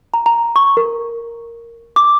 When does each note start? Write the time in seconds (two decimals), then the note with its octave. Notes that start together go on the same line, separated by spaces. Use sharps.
0.14 A#5
0.26 A#5
0.56 C#6
0.77 A#4
1.96 D6